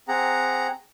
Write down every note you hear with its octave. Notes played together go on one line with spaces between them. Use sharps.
C4 G#4 F#5 A#5